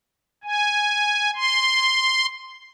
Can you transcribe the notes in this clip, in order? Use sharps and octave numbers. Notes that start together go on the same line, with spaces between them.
G#5
C6